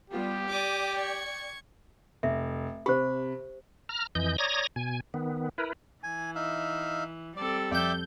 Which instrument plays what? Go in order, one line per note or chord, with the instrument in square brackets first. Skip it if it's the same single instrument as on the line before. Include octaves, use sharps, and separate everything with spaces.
[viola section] G3 B3 F4 [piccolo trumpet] G4
[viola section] D5 G5 [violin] D6 D#6
[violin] C#6 G#6
[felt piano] F1 [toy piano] E5
[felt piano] C3 B5 [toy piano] G4 C5
[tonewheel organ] A#5 F6
F2 E3 D#5 G6
C#5 D5 A#5 D#6 G#6 A#6
B2 G#5
D#3 B3
E4 A#4 B4
[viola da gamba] E3 [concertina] G#5
[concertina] D#4 E5 F5
[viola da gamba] G3 C4 A4 [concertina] D5
[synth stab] F2 G6 [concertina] D5 E5 G5